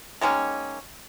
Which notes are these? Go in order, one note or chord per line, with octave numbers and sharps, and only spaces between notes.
D#3 G#3 A#3 C#4